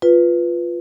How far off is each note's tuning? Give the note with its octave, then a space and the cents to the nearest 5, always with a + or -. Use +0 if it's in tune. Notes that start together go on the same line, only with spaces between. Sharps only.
F4 +0 B4 +0